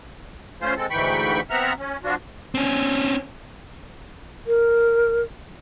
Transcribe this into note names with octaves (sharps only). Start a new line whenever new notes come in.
A3 C#4 F4 C5
G#3 C4 A4
D2 G#2 E3 G5 B5 C#6
B3 C4 E5 F#5 A#5 F6
C#4
F3 D4 F4 F#4
C4 C#4
A#4